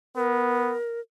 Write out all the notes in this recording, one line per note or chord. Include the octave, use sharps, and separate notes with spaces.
B3 A#4